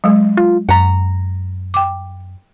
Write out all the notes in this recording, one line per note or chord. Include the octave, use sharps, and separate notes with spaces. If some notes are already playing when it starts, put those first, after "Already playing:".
F#3 G#3
F4
F#2 F#5 A#5
G5 D6